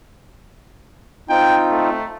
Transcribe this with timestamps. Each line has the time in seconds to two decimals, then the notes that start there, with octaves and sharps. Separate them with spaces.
1.30 C4 D#4 F4 G5
1.71 A3